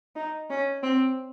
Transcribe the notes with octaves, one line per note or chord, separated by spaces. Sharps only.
D#4
C#4
C4